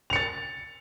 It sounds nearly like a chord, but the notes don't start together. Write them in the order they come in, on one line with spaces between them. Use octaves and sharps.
F7 C#7 A6